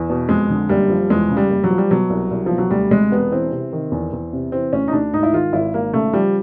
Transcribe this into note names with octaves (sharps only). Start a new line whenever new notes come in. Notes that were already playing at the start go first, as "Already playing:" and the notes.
Already playing: E2
B2
F2 G#3
D3
F#1 G3
F3
E2 G#3
C#3
G3
F#1
F#3
F3
G3
B2 F#3
C2
C2
B2 F3
F#3
D2 G3
C3 G#3
E1 B3
E3 C4
C3
D#3
E2
E2
C3
E3 C4
D2 C#4
D#4
D2 D4
G#2 D#4
E4
D#3 F4
G#1 E4
G#1 A#3
C#3 A3
F3 G3